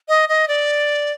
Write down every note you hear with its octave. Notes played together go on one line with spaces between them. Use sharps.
D#5
D#5
D5